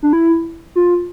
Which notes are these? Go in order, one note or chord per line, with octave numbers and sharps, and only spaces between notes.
D4
E4
F4